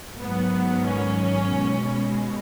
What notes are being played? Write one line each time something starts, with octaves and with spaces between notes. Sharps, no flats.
G#2 D#3 F#3 B3
C#4
B2 G#3